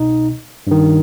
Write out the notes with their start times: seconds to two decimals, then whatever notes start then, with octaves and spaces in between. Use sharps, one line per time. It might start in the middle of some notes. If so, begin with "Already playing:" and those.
Already playing: C2 B2 D#4
0.67 G2 D#3